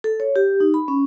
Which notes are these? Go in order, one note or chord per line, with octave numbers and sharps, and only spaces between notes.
A4
C#5
G4
D#4
B5
C#4